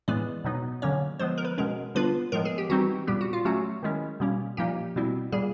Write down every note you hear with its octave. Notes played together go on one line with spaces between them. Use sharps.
A2 E3 G#3 B3 D5
B2 F#3 B3 D#4
D3 F#3 A#3 C#4 C#5
F3 G#3 B3 C5
A#4
B4
B2 G#3 C#4 A#4
D3 G3 B3 D4 F4 B4
A2 F3 G#3 B3 A#4
G#4
G4
E3 G3 C4 D#4 F#4
A#2 G3 B3 G4
F#4
F4
F#3 A3 C#4 F#4
D#3 G#3 C#4 E4
B2 G3 A#3 C#4
A#2 F3 A#3 D#4 G4
B2 G3 C4 E4
A#2 G3 A#3 G#4